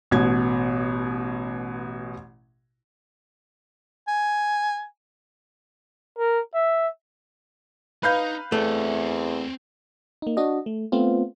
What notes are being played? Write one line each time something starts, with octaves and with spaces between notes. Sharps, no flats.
A1 B2 G#6
G#5
A#4
E5
D#4 B4 F5 G6
E2 A3 C4 C#5
A#3 D#4
D4 F#4 D#5
A3
A3 B3 C4 F4